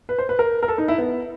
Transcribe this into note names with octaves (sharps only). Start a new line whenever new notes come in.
B4
C5
B4
A#4
A#4
A4
D#4
E4
B3